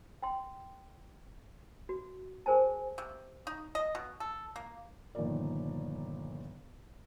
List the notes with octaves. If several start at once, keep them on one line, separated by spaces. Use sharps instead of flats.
G5 C6
F#4
G#4 A#4 C5 G#5 A5
C3
D#4
D#5
B2
A4
A#3
G1 A#2 D#3 F3 A#4 D5